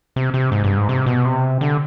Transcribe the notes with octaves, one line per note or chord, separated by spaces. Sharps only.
C3
C3
G#2
G2
G#2
C3
B2
C3
D3